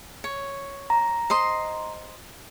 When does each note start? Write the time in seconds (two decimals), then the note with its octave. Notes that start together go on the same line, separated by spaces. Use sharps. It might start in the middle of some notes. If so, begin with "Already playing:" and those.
0.24 C#5
0.90 A#5
1.30 C5 D#5 C6